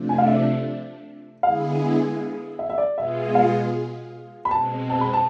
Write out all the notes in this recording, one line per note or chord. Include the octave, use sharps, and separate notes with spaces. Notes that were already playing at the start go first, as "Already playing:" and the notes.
Already playing: C3 F3 A3 D4
G#5
F5
E5
D3 G#3 B3 E4 G#4 F5
E5
E5
D5
B2 G#3 B3 F4 G#4 E5
F5
B5
B2 G#3 C4 A5
A5
B5
A5